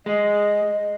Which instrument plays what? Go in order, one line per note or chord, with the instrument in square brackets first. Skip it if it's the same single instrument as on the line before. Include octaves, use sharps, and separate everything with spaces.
[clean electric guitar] G#3 [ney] D#5